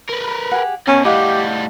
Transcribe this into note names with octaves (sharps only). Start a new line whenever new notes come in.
A#4 B4
G4 G#4 F#5
B2 C#4 A#4
A2 G3 G4 D#5 F5 F#5